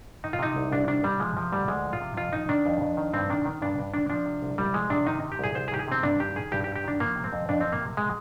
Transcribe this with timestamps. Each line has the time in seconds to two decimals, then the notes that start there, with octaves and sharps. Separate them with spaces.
0.24 D#3 D#4
0.33 F4
0.39 C3 D#4
0.56 C2
0.72 C2 D4
0.87 D#3 D4
1.04 C3 G3
1.20 F3 G#3
1.37 C3 F3
1.52 D2 G3
1.68 D2 G#3
1.85 F3
1.93 F4
2.01 C3
2.17 F2 F4
2.33 D#3 D#4
2.49 D#3 D4
2.66 F2
2.81 F2
2.97 D#3
3.14 G2 C4
3.30 D#3 D4
3.45 D#3
3.62 G2 D4
3.79 G2
3.94 D#3 D4
4.10 F3 D4
4.26 C3
4.42 C2
4.58 C2 G3
4.74 F3 G#3
4.90 C3 D4
5.06 D#3 D#4
5.24 C3
5.32 G4
5.39 C2 G#4
5.55 C2 C5
5.68 G#4
5.72 D#3 G4
5.79 G#4
5.88 C3 C4
6.03 G2 D4
6.19 D#3 G4
6.36 D#3 G#4
6.52 G2 G4
6.64 G4
6.67 G2
6.75 G4
6.84 D#3 D4
7.00 F3 A#3
7.16 C3
7.24 C4
7.33 F2
7.49 F2 D4
7.61 F3 C4
7.72 A#3
7.81 C3
7.97 G#3